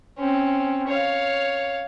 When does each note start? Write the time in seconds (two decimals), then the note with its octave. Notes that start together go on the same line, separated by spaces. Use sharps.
0.18 C4 C#4
0.88 C#5 F5